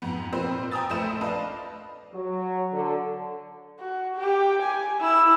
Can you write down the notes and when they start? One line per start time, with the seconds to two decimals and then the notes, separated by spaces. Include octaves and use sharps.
0.02 F2 G#2 B3
0.33 A#2 C4 B4 C5 E6
0.71 G5 G#5 A#5 D#6 E6 A6
0.90 A#1 A3 B4 C5 E5 E7
1.21 D4 B4 D#5 F5 A5
2.13 F#3
2.72 D3
3.80 F#4
4.16 G4
4.62 G#5
5.01 E4 E6